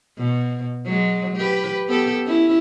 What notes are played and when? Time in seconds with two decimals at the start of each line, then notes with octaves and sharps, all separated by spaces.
0.18 B2
0.86 F#3 G#3
1.37 G4 B4
1.88 B3 G4 A4
2.26 C#4 E4